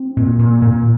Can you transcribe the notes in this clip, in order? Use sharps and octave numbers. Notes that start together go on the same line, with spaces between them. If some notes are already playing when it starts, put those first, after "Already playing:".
Already playing: C4
A#2
A#2
A#2